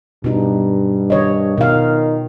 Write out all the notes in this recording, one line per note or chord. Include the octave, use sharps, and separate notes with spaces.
G2 B2 D#4
D#3 C#5 D#5
B2 D#3 F5